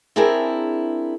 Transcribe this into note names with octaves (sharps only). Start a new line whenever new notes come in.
C4 D4 E4 G#4 A#4